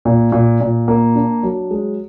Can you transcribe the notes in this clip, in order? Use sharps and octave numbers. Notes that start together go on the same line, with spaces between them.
A#2
A#2
A#2
A#3
D4
F#3
G#3